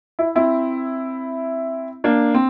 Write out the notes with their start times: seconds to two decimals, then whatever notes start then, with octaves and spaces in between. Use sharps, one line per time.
0.19 E4
0.35 C4 E4
2.04 A#3 D4
2.34 C4